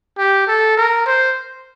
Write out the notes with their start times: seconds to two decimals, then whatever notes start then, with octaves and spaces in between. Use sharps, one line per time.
0.18 G4
0.47 A4
0.77 A#4
1.07 C5